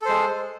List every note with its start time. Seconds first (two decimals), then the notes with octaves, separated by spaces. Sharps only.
0.02 A4
0.05 C5
0.09 G#3